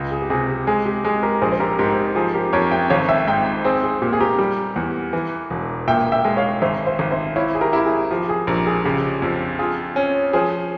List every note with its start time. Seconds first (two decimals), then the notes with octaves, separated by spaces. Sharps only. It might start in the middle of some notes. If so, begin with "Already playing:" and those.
Already playing: C#2
0.11 G#4
0.22 G4
0.30 C3 G#4
0.49 G4
0.67 G#3 G#4
0.86 G4
1.05 G#3 G#4
1.23 G4 A#4
1.41 A#1 G#4 C5
1.52 C5
1.60 G4 A#4
1.79 G#2 G4 A#4
2.15 F3 G#4
2.34 G4 A#4
2.53 F2 A#4 C#5
2.71 E5 G5
2.90 G#1 C#5 F5
3.09 E5 G5
3.27 G#2 E5 G5
3.64 C4 G#4 C5
3.83 G#4
4.02 A#2 G4
4.13 G#4
4.20 G4 A#4
4.39 G3
4.76 E2
5.13 E3
5.50 E1
5.87 A#2 E5 G5
6.12 E5 G5
6.25 G#3
6.37 C#5 F5
6.62 G#1 C5 E5
6.87 C5 E5
6.99 G#1
7.11 C5 E5
7.36 E4 C#5 F5
7.55 G#4
7.61 G4 A#4
7.73 E4 G4
7.86 G#4
8.11 F3 G4
8.29 G#4
8.47 A#1 G4 A#4
8.67 G#4
8.85 C#3 G4
9.22 F2
9.59 F4 G#4
9.96 C#4
10.33 F3 G#4 C5